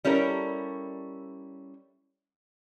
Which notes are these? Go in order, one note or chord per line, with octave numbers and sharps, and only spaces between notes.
G3 C#4 E4 A4 A#4